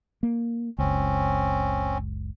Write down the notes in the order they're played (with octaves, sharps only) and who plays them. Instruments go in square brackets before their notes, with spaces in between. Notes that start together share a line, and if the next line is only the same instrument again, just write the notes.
[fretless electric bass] A#3
[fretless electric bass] F#1 C#2 [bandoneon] C4 C#4